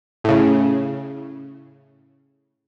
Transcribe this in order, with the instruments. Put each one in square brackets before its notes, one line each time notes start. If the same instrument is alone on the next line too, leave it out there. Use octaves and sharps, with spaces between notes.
[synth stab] A2 C#3